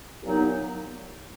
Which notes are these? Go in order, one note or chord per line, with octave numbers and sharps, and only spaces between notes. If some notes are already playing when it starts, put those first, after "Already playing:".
C2 A#2 F#3 B3 D#4